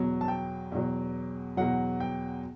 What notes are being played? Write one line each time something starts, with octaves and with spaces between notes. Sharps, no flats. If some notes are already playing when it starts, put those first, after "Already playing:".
Already playing: E2 B2 F#3
A5
G5
E2 B2 F#3
E2 B2 F#3 F#5
G5